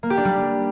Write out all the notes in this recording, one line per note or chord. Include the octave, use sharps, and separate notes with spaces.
A#3
G4
D4
G3